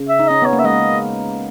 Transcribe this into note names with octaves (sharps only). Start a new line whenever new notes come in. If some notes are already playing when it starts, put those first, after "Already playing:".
Already playing: C#3
E5
D#4
C#4 D#5
B3 C#5
A#3
E5
G#3 D#5